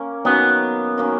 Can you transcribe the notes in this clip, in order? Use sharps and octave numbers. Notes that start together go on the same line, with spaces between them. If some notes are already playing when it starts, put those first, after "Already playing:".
Already playing: A#3 C#4
D#3 F#3 A#3 B3 C#4
D#3 F#3 A#3 C#4